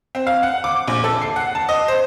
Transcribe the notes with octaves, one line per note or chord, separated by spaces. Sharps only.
C4
F5
F#5
D6
A#1
A4
C7
F#5
A5
D#5
C5